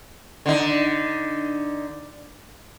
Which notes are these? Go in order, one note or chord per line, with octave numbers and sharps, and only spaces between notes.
D3 D#4